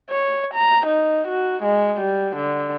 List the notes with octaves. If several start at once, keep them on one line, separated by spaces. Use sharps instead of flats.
C#5
A#5
D#4
F#4
G#3
G3
D3